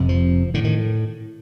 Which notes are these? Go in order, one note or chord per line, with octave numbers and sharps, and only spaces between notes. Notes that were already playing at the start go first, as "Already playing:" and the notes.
Already playing: F1 F2 C3
F3
A2 D3
D#3